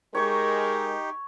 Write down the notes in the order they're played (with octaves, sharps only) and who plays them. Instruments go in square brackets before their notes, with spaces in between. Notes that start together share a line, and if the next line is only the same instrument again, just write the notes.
[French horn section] G#3 A#4 [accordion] D#4 G4 [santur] C#5 C#6